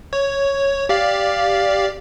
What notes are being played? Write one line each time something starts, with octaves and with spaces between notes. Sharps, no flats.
C#5
G4 D5 F5